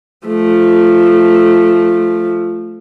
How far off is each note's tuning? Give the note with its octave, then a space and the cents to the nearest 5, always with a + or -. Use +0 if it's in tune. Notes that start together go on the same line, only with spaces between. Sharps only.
F3 -5 A3 -15